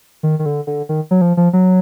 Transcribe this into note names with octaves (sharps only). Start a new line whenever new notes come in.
D#3
D#3
D3
D3
D#3
F#3
F3
F3
F#3